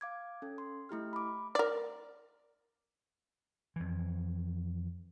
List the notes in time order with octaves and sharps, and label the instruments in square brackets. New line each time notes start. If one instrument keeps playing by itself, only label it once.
[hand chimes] F5 D6 G#6
C#4 A4
C6
A3 E4 G4 F6
B5 D6
[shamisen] A#4 D5
[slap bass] F2 E3